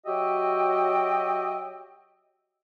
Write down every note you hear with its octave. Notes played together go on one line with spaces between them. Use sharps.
F#3 F#4 G4 D#5 E5 G5